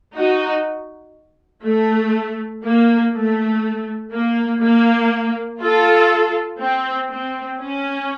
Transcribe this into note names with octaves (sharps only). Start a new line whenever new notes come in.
D#4 F#4
A3
A#3
A3
A#3
A#3
F4 A4
C4
C4
C#4